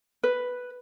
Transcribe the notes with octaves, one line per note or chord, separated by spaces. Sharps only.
B4